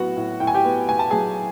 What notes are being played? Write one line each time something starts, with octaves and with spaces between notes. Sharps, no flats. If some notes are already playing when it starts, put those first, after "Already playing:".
Already playing: A2 F#3 B3 F#4 F#5
A2
A2 G5
G#5
G4 G5
B3
B3 G#5
A5
F#3 G#4 G#5